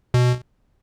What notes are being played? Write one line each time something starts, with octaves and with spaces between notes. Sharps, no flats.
B2